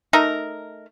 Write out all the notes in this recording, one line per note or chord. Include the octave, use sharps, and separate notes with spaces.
A3 D#4 A#4